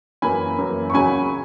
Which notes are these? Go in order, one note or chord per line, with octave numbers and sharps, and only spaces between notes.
F#2 E3 A#3 G#5 B5
F#2 E3 A#3
C#6
C#2 C#3 F#3 A#3 G#5 B5